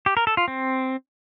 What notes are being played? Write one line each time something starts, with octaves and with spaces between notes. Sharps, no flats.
G4
A#4
A4
F4
C4